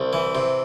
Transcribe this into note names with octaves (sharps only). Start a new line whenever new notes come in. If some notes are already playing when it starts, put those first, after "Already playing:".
Already playing: C2
E3
C3